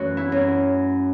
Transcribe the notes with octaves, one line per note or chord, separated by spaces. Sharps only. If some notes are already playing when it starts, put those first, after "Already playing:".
Already playing: F#2 E3 A3 F#4
E4
F#2